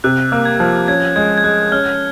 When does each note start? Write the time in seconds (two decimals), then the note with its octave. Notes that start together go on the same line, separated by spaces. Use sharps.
0.04 C3 F#6
0.32 A#3
0.45 G#6
0.60 F3
0.88 C#4 G#6
1.16 G#3 G#6
1.38 G#6
1.44 G#3 F#6
1.72 C#4 F6